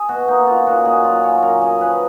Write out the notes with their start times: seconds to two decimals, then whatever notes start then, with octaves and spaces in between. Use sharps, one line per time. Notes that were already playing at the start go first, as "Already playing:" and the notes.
Already playing: G#4
0.09 B2 F#4
0.28 A#3 D#4
0.47 C#4 F4
0.67 A#2 F#4
0.85 A#2 G#4
1.04 F#3 F4
1.23 C#4 C#5
1.42 F#2 A#4
1.62 C#4 G#4
1.80 F3 B4